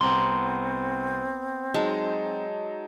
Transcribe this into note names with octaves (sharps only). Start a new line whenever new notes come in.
C2 B3 C4 A#5 C6
F#3 G#3 D#4 A5